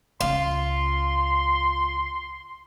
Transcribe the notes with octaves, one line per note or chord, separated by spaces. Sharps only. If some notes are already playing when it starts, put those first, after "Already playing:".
C#2 C#4 F4 C6